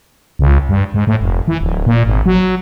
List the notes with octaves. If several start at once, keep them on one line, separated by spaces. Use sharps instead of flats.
C#2
G2
G#2
A2
F1
E3
D1
A#2
G#1
F#3